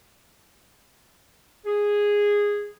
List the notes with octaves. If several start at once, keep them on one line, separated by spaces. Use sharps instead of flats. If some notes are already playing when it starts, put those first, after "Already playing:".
G#4